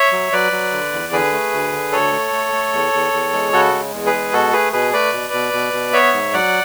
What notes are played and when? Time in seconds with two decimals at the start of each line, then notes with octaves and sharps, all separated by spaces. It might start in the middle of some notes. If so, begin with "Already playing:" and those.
Already playing: C#5 E5
0.12 F#3
0.32 F#3 B4 D5
0.52 F#3
0.72 D3
0.92 E2
1.13 D3 G#4 B4
1.32 A3
1.52 D2
1.73 D3
1.92 D2 A4 C#5
2.12 A3
2.33 A3
2.53 A3
2.73 E2
2.93 E2
3.13 E2
3.33 G#3
3.53 C#3 F#4 A4
3.73 G#3
3.93 E2
4.06 G#4 B4
4.13 G#3
4.33 B2 F#4 A4
4.53 A3 G#4 B4
4.73 B2 G#4 B4
4.93 A3 B4 D5
5.13 B2
5.33 B2
5.53 B2
5.73 B2
5.93 B3 C#5 E5
6.13 G#2
6.33 F#3 D5 F#5